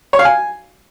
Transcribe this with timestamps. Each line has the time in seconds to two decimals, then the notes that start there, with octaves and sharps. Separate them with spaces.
0.13 C#5
0.19 F5
0.25 G#5